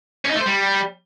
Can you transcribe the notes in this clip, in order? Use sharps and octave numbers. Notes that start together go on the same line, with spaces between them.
C#4
D#4
A3
C5
G3